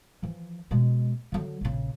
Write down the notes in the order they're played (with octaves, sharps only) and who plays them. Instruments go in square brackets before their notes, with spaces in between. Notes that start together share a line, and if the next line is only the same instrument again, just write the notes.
[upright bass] E3 F3
B2 G#3
D3 F#3
A#1 C#3